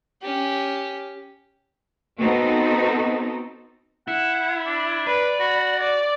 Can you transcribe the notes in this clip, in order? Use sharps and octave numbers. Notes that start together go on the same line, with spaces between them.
C#4 G4
B3 C4 D#4 F#4 A4
E4 F#5
D4
B4 D5
F#4 B5
D5